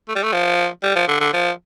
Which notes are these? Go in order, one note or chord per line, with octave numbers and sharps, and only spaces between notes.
A3
G3
A3
F3
G3
F3
D3
D3
F3